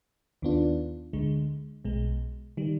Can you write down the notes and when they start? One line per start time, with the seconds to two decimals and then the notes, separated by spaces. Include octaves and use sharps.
0.42 D#2 D#3 B3 D4 F4
1.13 D2 D3 G#3
1.85 B1 B2 G#3
2.57 D#3 G3